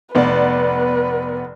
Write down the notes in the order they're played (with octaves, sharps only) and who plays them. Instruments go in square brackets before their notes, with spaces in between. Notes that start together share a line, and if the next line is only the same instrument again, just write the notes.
[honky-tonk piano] F1 B3 D5 [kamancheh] B4